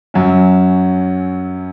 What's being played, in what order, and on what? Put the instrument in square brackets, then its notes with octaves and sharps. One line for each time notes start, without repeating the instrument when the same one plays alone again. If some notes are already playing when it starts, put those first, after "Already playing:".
[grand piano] F#2 F#3 C#4